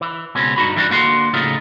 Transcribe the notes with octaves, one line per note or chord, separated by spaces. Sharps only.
E3
C#2 B2 C4 C#4
G2 D#4 F#4 B5
E3 G3 B3 D4 F#4
D3 A#3 F#4 D#5 C6
A2 C#3 F3 A3 D#4 F4